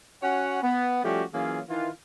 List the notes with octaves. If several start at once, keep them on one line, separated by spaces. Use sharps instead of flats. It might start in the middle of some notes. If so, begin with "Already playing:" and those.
C#4 F#4 C#5 F#5
B3
F3 G3 A3 C#4 F#4 G4
E3 F#3 A#3 C#4 F4 G#4
D#3 E3 F4